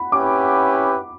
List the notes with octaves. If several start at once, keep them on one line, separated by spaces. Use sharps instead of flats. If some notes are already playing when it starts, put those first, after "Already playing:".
Already playing: F#5 B5
C#4 E4 G4 B4 D6